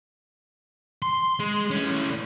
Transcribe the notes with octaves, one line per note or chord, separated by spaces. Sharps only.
C6
G#3
A2 C#4